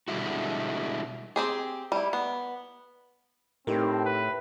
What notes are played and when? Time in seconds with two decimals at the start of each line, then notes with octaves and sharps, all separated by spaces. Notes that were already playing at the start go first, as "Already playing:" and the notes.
0.08 B2 D3 G3 G#3 E4 F#4
1.36 C4 G4 G#4
1.92 G3 E4
2.13 B3
3.67 A2 C4 D#4 G4 A#4
4.05 B4